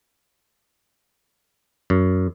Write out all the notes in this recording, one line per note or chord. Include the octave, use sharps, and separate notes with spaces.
F#2